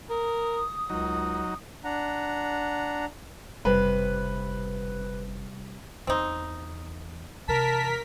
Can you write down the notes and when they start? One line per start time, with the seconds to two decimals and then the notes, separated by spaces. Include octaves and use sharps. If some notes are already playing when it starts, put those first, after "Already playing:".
0.10 A#4 D#6
0.90 C#2 F#3 D#4
1.84 D4 F#5 A#5
3.65 F#1 C3 G3 B4
6.07 E2 C4 D#4
7.48 C3 E3 A#4 A5 B6